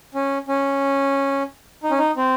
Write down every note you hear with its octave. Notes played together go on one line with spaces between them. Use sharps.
C#4
C#4
D#4
C#4
D#4
C4